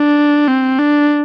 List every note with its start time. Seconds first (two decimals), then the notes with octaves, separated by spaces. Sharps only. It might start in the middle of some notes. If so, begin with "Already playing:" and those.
Already playing: D4
0.48 C4
0.79 D4